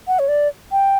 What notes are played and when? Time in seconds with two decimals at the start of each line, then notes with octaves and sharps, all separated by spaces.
0.07 F#5
0.19 C#5
0.28 D5
0.72 G5